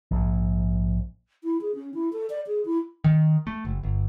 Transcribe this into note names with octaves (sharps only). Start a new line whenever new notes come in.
A#1 G#2
E4
G#4
C#4
E4
A4
D5
G#4
E4
D#3
A3
F#1
G1